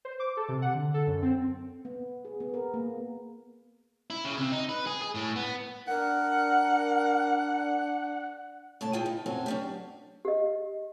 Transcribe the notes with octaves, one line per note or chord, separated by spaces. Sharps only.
C5
D6
A4
C3
F#5
D3
A4
F#2
C4
B3
G#4
B3
A#4
A#3
E4
C#3
C3
D#4
B4
G#4
G#4
A2
B3
D4 A#4 F#5
A2 C#3 A5
E4 F4 G#4 G5
D#4
F#2 F#3 C4 A4 G#5
C#4 D4 G4
G4 D#5